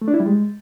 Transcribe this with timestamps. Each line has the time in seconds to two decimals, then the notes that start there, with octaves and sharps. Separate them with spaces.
0.01 A3
0.08 D4
0.14 E4
0.20 G3
0.26 G#3